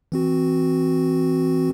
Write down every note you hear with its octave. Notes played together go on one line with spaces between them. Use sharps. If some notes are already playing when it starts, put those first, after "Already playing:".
E3 C4 F#4